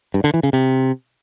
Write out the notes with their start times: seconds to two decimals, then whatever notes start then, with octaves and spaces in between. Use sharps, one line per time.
0.14 G2
0.24 D3
0.34 E3
0.43 C#3
0.53 C3